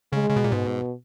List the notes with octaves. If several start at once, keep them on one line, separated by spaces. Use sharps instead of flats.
C#3 G#3
C#3
B2
A#2
G#2 B2